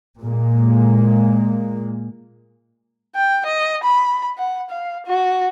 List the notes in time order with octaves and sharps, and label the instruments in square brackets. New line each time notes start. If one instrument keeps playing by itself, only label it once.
[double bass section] A#2 G#3 A#3
[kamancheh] G5
D#5
B5
F#5
F5
F#4